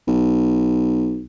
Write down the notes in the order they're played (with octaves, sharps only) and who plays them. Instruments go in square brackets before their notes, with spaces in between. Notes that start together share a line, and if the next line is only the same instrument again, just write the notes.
[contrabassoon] B1